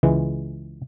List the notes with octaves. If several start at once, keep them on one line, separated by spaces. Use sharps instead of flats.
C#2 E3 G#3